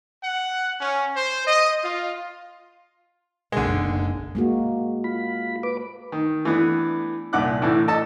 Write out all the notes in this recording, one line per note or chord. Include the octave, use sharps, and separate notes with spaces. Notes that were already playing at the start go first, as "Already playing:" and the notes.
F#5
C#4
C5
D#5
F4
F#1 B1 D3 G#3
G#3 A#3 F#4
F4 B5
B4 D6
D#3
E3 A3 B3 D4
C2 A#2 F#5 D6 F#6
A2 E3 A3 D4
A4 D#5 A5